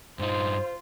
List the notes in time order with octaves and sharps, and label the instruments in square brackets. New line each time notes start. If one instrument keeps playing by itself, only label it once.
[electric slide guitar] G2 D#4 [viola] F4 [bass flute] C5